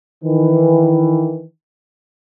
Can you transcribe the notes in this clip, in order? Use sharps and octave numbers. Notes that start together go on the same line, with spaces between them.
D#3 E3